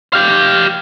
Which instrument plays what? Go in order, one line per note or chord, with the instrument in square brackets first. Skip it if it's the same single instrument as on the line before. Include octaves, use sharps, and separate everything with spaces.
[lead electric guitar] G4 F5